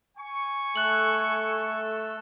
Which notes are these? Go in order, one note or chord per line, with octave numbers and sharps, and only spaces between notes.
G#5 C#6
A3 A4 E6 F#6 F#7